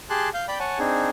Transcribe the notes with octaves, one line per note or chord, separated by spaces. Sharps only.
G4 G#4 A5 C6 F#6
F5 G6
D5 G5 B5 G6
C#5 F#5 G#5 A5
C4 D4 D#4 G#4